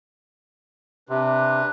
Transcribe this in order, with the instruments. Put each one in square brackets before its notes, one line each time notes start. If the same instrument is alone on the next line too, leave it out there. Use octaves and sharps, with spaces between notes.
[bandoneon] C3 [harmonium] D4 B4